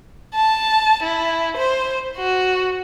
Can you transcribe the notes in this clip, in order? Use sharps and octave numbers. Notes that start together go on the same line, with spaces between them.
A5
E4
C5
F#4